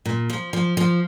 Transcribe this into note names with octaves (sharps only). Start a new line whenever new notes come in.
A#2
F3
F3
F3